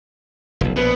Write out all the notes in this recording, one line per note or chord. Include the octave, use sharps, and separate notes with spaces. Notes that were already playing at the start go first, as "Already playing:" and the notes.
F1 B1
A#1 B2 B3